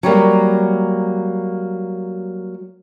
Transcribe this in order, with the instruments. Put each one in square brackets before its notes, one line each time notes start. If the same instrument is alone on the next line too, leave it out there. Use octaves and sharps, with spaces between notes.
[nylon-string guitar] F#3 G3 A#3